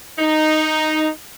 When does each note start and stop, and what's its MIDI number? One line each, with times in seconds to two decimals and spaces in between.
0.19 1.09 63